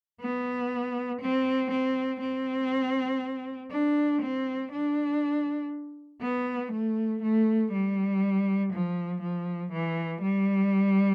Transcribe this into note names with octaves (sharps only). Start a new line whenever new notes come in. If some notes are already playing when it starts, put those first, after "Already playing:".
B3
C4
C4
C4
D4
C4
D4
B3
A3
A3
G3
F3
F3
E3
G3